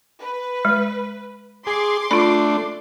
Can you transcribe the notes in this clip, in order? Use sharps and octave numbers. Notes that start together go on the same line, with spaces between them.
B4
G#3
G#4 C6 D6 C7
A3 D4 F4 B5